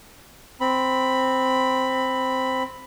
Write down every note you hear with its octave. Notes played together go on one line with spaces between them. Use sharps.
C4 B5